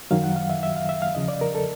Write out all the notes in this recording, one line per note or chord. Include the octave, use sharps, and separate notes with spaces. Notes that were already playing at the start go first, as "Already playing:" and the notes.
F#2 D#3 F#3 F5
F#5
F5
E5
E5
F5
E5
F5
E2 C#3 F3 D#5
D5
A#4
A4